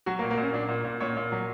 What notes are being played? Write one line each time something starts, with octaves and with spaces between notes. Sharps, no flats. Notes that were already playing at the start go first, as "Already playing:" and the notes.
F#3 F#4
A#3
A#2
A#3
A#2 C#4
A#2 D4
A#2
A#2
A#2 C#5
A#2
F#3